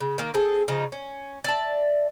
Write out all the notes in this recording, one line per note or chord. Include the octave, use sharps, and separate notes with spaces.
C#3
D#3 A#3
C4 G#4 A4
C#3 F3 D#4
C#4
D5 E5 A5